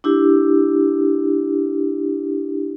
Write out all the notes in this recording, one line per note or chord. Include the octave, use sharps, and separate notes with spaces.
D4 E4 G4